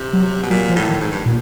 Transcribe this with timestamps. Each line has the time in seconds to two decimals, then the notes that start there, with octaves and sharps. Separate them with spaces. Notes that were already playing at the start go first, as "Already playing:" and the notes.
Already playing: C3
0.13 F#3
0.43 B2
0.50 A#2 F#3
0.69 F3
0.76 A2
0.88 D#3
1.00 G#2
1.12 G2
1.25 A#2